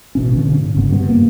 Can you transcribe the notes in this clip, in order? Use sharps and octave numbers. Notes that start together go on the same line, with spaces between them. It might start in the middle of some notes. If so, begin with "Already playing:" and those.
A1 B2 C#4
D3 C#4
G#2
F#1 G#2 C#3 B3
G2 A#2 B3
A#3